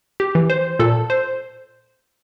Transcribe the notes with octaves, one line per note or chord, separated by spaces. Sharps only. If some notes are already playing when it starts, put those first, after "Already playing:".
G4
E3
C5
A#2 A4
C5